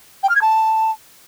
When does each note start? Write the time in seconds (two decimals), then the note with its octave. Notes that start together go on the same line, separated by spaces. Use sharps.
0.23 G5
0.29 F6
0.35 G#6
0.41 A5